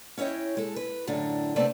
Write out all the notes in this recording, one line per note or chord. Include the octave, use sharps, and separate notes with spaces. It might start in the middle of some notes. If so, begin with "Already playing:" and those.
C#4 E4 C#5 D#5 G5
G#3 A4
B4
F#2 A2 D3 D4
C3 A3 B3 C4 D5 A5